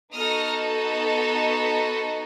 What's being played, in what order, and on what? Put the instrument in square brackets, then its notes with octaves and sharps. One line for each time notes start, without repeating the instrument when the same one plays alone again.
[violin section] B3 D#4 F#4 A4 D#6 F6